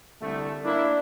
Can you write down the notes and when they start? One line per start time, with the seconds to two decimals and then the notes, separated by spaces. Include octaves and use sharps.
0.21 C2 D3 A3
0.64 A#3 D4 E4